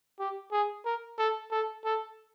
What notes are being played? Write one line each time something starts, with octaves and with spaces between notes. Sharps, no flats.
G4
G#4
A#4
A4
A4
A4